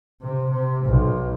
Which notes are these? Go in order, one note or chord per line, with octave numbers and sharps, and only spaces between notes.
C3
C3
B1